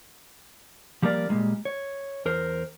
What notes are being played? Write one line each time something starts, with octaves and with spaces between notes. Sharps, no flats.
F3 G3 A#3 A#4 D5
A#2 F3 G3 G#3 A#3
C#5
E2 A#4 C5